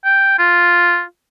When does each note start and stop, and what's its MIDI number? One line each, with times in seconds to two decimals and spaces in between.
0.05 0.34 79
0.39 1.02 65